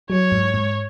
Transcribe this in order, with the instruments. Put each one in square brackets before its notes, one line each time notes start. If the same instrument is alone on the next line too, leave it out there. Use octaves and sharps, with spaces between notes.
[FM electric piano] F#3 [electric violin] C#5
[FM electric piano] G#2
G#2